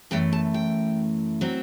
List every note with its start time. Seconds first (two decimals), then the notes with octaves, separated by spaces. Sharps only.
0.11 F#2 E3 A3 G5
0.33 A5
0.54 G5
1.41 F#3 C4